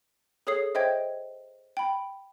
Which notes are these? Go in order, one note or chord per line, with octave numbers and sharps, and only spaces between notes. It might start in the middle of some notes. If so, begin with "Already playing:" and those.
G#4 A4 C#5 D#6 C7
C5 D#5 E5 G5 G#6
G5 B5